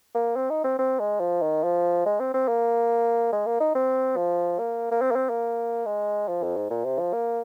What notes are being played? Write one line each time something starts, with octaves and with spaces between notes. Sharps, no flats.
A#3
C4
D#4
C4
C4
G#3
F3
D#3
F3
G#3
C4
C4
A#3
G#3
A#3
D#4
C4
F3
A#3
A#3
C4
A#3
C4
A#3
G#3
F3
F2
G#2
A#2
C3
F3
A#3